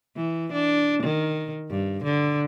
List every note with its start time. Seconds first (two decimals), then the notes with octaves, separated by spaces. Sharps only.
0.16 E3
0.52 D4
1.03 D#3
1.70 G2
2.04 D3